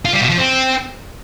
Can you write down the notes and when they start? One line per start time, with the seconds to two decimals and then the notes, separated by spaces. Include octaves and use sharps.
0.05 F4
0.13 G3
0.21 B2
0.29 F3
0.38 C4